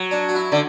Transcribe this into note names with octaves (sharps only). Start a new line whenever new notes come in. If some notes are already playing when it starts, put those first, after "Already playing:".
Already playing: F#3
D4
F#4
E4
D3 D5